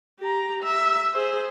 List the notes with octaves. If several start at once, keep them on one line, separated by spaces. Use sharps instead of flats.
G4 A#5
E5
G#4 C5